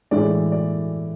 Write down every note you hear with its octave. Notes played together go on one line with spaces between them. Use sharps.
A2 E3 G#3 D5
D5